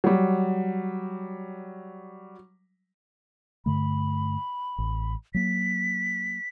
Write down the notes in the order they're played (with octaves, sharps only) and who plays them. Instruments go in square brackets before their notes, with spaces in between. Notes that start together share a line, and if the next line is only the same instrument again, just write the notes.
[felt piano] F#3 G3
[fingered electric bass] G2 D3 A3 [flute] B5
[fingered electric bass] A1
[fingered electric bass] F#3 A#3 [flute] B6